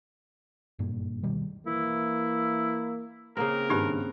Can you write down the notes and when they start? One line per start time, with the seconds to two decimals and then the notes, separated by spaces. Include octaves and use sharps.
0.79 F#1 G2 A#2
1.23 D2 B2 D#3 G3
1.67 E3 A#3 E4
3.37 C#3 A#3 C4 A#4
3.70 G#1 G2 D#4 G4 B5 F#6